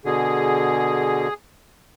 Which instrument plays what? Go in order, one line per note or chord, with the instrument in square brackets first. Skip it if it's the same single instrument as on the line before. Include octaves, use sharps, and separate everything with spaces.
[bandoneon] B2 D3 [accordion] G#4